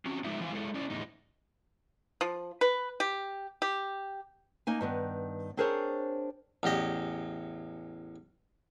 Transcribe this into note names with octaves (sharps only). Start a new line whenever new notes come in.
C4 C#4 F#4
A2 F3 G#3 D#4 F4 E5
E3 F3 F5 G#5
G#3 E4 A4
C#4 E4 D5
E2 A2 D#4
F3
B4
G4
G4
A#3 D#4 G#5
G2 D#3 B3
C4 D4 G#4 A#4 C5 C#5
A1 E2 G4 D#5